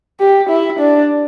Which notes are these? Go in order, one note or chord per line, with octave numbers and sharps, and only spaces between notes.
G4
E4
D4